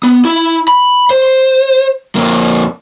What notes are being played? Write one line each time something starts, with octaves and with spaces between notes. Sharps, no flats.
B3
E4
B5
C5
F2 A#3